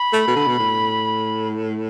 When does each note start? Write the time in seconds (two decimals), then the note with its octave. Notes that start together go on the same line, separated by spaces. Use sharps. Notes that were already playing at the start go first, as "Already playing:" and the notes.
Already playing: B5
0.13 A3
0.27 B2
0.36 D3
0.47 B2
0.59 A2